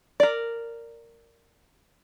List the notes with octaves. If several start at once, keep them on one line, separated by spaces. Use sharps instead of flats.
A#4 D5